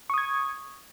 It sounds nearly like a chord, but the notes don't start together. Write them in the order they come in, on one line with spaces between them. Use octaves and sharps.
C#6 D#6 G#6